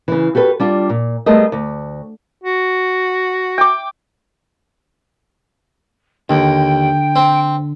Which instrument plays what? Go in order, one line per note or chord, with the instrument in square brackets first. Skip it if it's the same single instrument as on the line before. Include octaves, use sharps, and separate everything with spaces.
[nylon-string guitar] C#3 E3
F#4 G4 A4 B4
G3 D4 F4
A#2
G3 A3 B3 G#4 A#4 D#5
D2
[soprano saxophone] F#4
[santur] G5 D6
[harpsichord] D#2 [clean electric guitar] D3 [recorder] G5
[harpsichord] C4